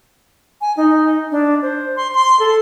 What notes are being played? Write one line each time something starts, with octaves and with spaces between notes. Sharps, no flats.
G#5
D#4
D4
C5
C6
C6
A4